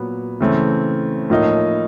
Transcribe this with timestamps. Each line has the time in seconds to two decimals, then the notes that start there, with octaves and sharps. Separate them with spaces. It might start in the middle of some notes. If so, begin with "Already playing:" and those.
Already playing: A#2 F#3 B3
0.40 C#3 E3 A3 C4
1.30 A2 F3 A#3 D#4